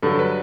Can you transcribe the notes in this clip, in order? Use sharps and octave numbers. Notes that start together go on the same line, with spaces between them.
G2 D3 F#3 A4
B4